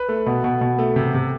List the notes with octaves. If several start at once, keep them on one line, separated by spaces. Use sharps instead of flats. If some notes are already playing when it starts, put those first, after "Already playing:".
Already playing: B4
A3
B2
B2
B2
A3
C3
C3